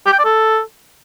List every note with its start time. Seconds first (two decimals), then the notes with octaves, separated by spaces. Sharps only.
0.07 G4
0.13 G5
0.19 D5
0.25 A4